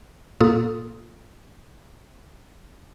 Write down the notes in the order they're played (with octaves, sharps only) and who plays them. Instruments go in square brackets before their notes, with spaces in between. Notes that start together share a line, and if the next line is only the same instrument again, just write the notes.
[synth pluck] A#2 A#3 F4 A4 D#6